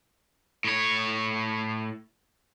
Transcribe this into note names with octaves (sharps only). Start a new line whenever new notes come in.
A2 C#5